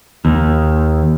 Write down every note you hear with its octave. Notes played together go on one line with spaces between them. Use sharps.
D#2